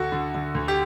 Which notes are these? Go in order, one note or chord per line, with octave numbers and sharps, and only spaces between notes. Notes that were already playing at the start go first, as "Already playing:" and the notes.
Already playing: D2 F#4 A4
D3
D3
D2
G4